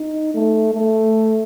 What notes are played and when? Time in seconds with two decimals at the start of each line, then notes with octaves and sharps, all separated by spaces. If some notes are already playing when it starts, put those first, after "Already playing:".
Already playing: D#4
0.34 A3
0.74 A3